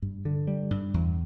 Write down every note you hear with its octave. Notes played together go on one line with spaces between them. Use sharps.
G2
D3
G3
G2
E2